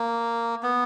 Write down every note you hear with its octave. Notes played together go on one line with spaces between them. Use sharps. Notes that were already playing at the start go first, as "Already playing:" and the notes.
Already playing: A#3
B3